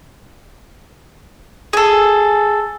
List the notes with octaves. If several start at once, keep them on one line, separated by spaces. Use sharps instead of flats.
G#4 A4